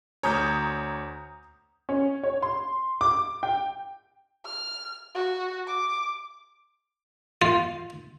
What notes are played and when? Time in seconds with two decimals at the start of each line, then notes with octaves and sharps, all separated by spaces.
0.23 D2 C#5 A#5 D#6 G6
1.89 C#4
2.23 C#5
2.42 C6
3.01 D6
3.43 G5
4.45 F6
5.15 F#4
5.67 D6
7.42 F4